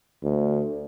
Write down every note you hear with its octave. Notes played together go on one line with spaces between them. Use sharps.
D2